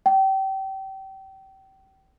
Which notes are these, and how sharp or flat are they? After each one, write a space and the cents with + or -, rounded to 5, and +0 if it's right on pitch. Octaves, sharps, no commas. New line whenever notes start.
G5 -30